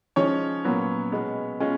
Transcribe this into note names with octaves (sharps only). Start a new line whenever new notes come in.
F3 G#3 C#4 D#4 C#5
A#2 F#3 B3
B2 G#3 B3
B2 G#3 C#4 F4